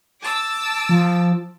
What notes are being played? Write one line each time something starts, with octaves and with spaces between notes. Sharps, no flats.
A5 D6 E6
F3